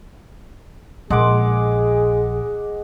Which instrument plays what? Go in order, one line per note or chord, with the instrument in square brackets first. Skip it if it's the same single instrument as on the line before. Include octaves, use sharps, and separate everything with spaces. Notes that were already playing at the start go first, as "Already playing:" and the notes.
[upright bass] A#1 [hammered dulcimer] G#3 F#5 D6 [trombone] G#4